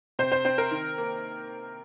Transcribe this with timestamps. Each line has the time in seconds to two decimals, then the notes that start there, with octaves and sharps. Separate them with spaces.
0.19 C3 C5
0.32 C5
0.45 C4 C5
0.58 A#4
0.71 D#3
0.98 A#3